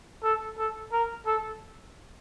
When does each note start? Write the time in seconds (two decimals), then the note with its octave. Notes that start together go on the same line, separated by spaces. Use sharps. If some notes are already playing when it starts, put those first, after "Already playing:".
0.23 A4
0.57 A4
0.92 A#4
1.26 A4